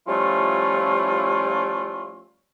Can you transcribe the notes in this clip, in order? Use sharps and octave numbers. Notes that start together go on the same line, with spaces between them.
F3 G3 A3 C#4 E4 F4